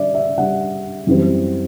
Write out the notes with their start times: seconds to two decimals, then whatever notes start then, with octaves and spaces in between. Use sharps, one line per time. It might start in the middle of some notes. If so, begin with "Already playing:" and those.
Already playing: D3 G3 D4 D5 E5
0.15 E5
0.37 D3 G3 D4 F#5
1.07 F#2 E3 G3 C4